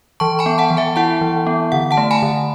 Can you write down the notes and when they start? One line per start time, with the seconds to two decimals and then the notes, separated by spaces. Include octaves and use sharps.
0.20 E3 A5 C#6
0.39 G#5 B5
0.46 B3
0.58 F#5 A5
0.71 E3
0.77 E5 G#5
0.96 E4 F#5 A5
1.21 E3
1.47 B3
1.72 D3 F#5
1.91 F#5 A5
1.97 A3
2.11 G#5 B5
2.23 D3